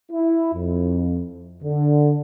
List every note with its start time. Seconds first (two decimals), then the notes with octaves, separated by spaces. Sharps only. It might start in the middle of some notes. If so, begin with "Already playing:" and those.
0.12 E4
0.54 F2
1.63 D3